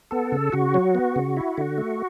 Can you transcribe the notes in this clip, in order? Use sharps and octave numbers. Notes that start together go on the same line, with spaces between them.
B3 A4
C#3
C#3 F#4
F#3
B3
C#3
E4
D3
A3